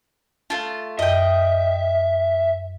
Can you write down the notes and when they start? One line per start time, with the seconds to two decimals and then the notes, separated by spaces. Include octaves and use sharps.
0.50 A3 F4 A5
0.99 F#2 D#5 E5 G5